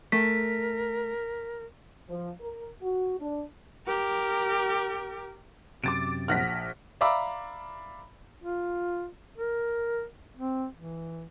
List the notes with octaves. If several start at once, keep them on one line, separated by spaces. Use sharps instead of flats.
A3 A#4 B6
F3
A#4
F#4
D4
G4 A#4
F#2 C3 D6 A6 D7
A#1 F#5 F6 F#6 A#6 B6
D5 E5 F5 A#5 B5 D6
F4
A#4
C4
E3